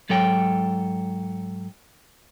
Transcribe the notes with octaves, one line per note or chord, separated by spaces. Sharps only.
G#2 F#3 A4 C#5 G5